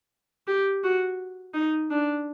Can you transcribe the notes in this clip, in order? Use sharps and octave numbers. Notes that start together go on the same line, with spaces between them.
G4
F#4
D#4
D4